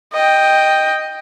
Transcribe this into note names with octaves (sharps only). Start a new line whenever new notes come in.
D#5 G5